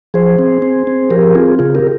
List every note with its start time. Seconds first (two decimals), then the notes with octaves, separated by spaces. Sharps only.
0.14 F3 G#4 C5
0.39 C4
0.62 C4
0.87 C4
1.10 F3 G4 A#4
1.35 C4 F4 G#4
1.59 C#3 F4 G#4
1.75 G4 A#4